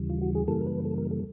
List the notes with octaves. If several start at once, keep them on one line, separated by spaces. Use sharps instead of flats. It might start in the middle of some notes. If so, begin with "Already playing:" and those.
Already playing: D#2 C#3 E3 G3
F4
F#4
G#4
F#2 C#3 E3 G3 A#3 A4
A#4
B4
A4
A#4
A4